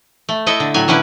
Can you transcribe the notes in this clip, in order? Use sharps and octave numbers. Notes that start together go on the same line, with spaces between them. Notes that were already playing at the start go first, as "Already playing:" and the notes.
A3
E4 A4 D#5 E5
D3
A2 F#3 G#5
D3 C#4 E4 B4